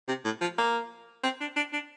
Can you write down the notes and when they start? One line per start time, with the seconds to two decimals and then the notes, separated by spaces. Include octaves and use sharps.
0.08 C3
0.25 A2
0.41 F3
0.58 A#3
1.24 C4
1.41 D4
1.56 D4
1.73 D4